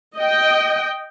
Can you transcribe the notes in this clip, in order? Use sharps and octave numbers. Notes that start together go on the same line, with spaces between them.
D#5 G5